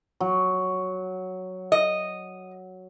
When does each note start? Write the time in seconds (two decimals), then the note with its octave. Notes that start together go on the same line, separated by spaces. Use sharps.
0.20 F#3
1.72 D#5